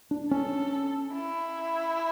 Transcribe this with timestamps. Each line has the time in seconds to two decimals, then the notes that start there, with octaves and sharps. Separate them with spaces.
0.11 D4
0.31 C#4 A4
1.13 E4